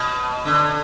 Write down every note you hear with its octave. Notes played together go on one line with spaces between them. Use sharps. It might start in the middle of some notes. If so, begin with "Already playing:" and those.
Already playing: B2
D3